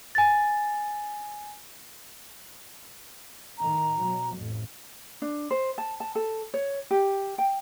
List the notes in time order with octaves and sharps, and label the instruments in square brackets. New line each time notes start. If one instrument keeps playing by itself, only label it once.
[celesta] G#5 A6
[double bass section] A2 D#3 [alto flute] A#5
[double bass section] B2 F#3
A1 F2
[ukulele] D4
C5
A5
A5
A4
C#5
G4
G5